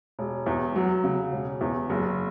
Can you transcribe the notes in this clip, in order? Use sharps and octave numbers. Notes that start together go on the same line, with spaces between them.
E1
E2
F#3
C#3
E1
E2
F#1